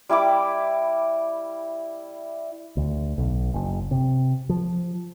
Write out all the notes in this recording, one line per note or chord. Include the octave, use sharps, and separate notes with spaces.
G3 E4 B5 D6
D2
B1
F#1
C3
F3